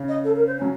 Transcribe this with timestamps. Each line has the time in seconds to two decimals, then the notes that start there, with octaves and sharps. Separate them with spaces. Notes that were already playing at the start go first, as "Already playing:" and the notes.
Already playing: C#3
0.08 D#5
0.24 A4
0.35 A#4
0.47 C5
0.58 C#4
0.62 F#3